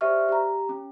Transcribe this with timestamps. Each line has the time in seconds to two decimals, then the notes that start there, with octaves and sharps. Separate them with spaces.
0.01 G4 C5 D5 E5 C#6 F6
0.29 G4 A#5
0.69 C#4